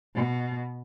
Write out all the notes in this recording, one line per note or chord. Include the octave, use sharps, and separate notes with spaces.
B2